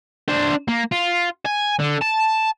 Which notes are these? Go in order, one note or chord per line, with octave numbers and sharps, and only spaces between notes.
D4 C5
A#3
F4
G#5
D3
A5